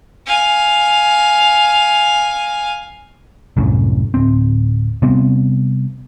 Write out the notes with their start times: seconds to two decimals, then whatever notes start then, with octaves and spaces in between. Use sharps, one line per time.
0.27 F5 G#5
3.57 C2 F#2 A2
4.14 D1 C4
5.02 C3 G3 B3 C4